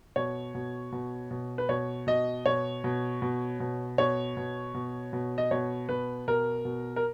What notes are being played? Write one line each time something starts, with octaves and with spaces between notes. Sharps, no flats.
B2 C#5
B2
B2
B2
B4
B2 C#5
B2 D#5
B2 C#5
B2
B2
B2
B2 C#5
B2
B2
B2
D#5
B2 C#5
B2 B4
B2 A#4
B2
A#4